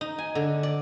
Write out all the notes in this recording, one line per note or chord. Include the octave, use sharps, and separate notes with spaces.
D#4
G#5
D3
D5